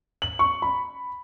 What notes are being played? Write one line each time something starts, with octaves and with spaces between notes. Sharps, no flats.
F#7
C#6
B5